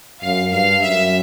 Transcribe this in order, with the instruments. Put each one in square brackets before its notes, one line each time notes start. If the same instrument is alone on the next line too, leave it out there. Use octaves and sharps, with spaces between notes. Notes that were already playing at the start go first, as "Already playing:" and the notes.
[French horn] F#2 [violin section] F5
[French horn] G2 [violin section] F5
[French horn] F#2 [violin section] E5